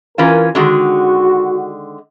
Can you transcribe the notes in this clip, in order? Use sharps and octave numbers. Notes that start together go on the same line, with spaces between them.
E3 C#4 F4 A#4
D3 D#3 G#3 F#4